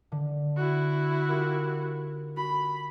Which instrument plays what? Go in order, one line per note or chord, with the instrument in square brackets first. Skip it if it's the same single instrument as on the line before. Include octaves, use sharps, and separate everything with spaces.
[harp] D3
[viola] E4 F#4
[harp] F4 G4 A#4
[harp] F#4 [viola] B5